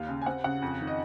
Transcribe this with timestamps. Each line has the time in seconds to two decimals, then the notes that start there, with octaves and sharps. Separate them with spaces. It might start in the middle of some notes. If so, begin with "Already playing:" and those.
Already playing: D#2 F5
0.09 C#3
0.22 G#5
0.26 C4 F#5
0.44 C#3 F#5
0.62 F2
0.81 D#3
0.87 D#5